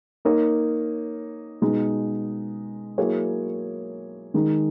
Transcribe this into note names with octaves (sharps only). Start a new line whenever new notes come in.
A#3 D#4 A#4 C#5
B2 G#3 D#4
F#3 A#3 E4 G#4 C#5
D#3 G#3 D#4